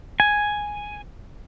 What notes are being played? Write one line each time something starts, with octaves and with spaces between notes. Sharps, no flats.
G#5